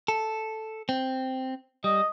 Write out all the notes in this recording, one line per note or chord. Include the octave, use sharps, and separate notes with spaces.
A4
C4
G3 D#5